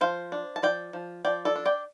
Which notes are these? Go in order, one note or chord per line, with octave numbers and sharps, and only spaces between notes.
F3 C5 F5
D4
A5
F3 D5 G5
F3
F3 D5 G5
A4 D5
D4
D5 G5